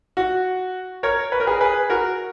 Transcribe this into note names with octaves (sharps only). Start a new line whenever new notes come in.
F#4
A#4 C#5
B4
A#4
G#4 B4
G#4 B4
F#4 A#4